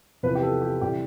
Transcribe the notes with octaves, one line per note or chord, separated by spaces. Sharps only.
E2 C3 F3 B4
G4
A4
G4
C3 E3 G3 G4